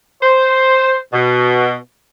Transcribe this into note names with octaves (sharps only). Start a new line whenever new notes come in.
C5
B2